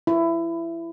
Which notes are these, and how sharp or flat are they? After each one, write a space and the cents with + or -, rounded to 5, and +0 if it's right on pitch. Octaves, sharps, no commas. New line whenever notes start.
E4 +20